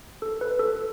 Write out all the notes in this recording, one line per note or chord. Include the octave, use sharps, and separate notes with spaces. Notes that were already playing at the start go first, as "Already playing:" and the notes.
A4
B4
A4